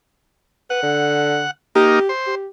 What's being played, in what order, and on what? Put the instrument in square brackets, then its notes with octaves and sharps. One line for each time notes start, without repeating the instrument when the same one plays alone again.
[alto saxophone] B4 [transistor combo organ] F#5
[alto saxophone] D3
[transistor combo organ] A#3 D#4 [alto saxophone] G4
[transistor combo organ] C5
[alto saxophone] G4